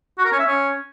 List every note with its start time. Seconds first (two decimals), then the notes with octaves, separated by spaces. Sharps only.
0.18 F#4
0.25 A#4
0.32 C#4
0.39 E5
0.46 C#4